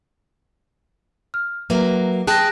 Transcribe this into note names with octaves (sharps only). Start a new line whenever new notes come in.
F6
F#3 A#3 B4 E5
G#4 G5 A5 F#6 A#6